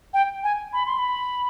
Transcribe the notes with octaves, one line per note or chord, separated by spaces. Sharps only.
G5
G#5
B5
C6
B5